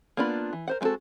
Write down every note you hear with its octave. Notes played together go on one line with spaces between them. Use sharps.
A#3 B3 D4 F4 B5
E3
A#4 C5 F#5
G#3 B3 C4 F#4 A4